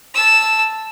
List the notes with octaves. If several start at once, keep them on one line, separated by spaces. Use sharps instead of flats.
A5 E6